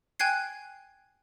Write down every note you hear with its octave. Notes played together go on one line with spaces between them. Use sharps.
G5 G#5 F#6 G#6 C7